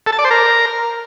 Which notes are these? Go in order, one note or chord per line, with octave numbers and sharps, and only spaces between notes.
A4
A5
D5
C5
A#4